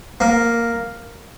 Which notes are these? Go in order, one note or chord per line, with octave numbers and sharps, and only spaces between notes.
A#3